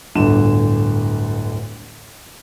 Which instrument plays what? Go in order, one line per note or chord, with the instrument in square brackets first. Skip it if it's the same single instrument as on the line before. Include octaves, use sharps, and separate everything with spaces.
[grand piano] D1 G1 D3 E7